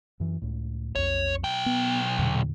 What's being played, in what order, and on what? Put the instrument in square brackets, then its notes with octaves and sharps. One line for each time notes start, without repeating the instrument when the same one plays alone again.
[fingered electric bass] F#2 E3
C#2 A2
[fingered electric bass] B1 F2 [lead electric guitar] C#5
[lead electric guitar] B1 G5
[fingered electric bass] B3
E2 A#2 D3